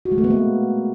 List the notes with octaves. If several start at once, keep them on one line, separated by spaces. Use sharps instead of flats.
F#4
G#3
A3
B3
A#3